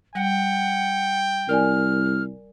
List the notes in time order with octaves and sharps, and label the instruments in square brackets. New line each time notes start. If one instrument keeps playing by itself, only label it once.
[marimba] G3 [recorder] F#5 [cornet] G5
[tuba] C2 [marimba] A#4 D5 G#5 [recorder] F6